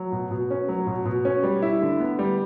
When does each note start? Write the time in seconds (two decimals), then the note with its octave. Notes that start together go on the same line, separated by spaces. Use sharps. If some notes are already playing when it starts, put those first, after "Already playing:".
Already playing: F#3
0.12 B2
0.31 B2
0.51 C#4
0.69 F#3
0.87 B2
1.06 B2
1.25 C#4
1.43 G3
1.62 E4
1.82 D3
2.00 B3
2.19 G3